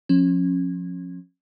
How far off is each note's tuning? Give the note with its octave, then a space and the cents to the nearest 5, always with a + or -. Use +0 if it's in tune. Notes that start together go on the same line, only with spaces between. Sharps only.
F3 +25 C#4 -25